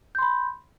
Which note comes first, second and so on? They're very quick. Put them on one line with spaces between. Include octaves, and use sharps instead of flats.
G6 C6 B5